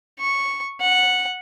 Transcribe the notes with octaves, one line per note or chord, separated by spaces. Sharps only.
C#6
F#5